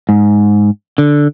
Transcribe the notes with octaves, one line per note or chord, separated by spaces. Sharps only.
G#2
D3